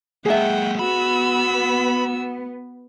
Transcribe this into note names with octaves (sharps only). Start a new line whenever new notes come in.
G#3 A#3 G#4 E5 F#5 G5
B3 F#4 B5 E6